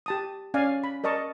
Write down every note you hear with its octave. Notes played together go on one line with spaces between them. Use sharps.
G4 A5 D#6
C#4 D5 F5 G#5
B5
A#4 D5 D#5 A5 C#6